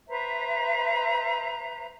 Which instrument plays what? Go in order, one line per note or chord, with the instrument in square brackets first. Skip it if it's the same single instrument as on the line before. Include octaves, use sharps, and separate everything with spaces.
[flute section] B4 C5 E5 A#5